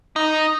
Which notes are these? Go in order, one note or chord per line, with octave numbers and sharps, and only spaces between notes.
D#4